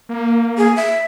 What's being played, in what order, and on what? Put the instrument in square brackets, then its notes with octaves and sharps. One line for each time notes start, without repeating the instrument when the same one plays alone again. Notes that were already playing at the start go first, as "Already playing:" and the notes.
[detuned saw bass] A#3
[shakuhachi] G#4
E5